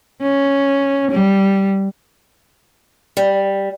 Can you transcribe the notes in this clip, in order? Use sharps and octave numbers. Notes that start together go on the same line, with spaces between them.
C#4
G3
G3